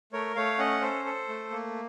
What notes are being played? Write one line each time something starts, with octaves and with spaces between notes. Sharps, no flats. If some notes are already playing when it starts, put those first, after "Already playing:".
A3 A#4 C#5
A3 C#5 F5
C#4 D#5 F#5
A4 C5
A4
A3
A#3